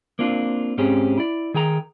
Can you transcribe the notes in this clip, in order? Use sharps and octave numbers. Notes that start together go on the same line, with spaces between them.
A#3 C4 D4 F4
G#2 C4 C#4 G4 G#4
E4 D5
D#3 G#4 G5 A#5